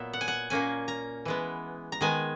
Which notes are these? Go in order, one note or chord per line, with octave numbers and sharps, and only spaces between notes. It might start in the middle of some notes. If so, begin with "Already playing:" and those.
Already playing: A#2 F#3 B3 E5
F#5
G#5
F#5
A#2 A#3 C#4 G#5
A#5
E3 G#3 B3
A#5
D#3 G#3 B3 G#5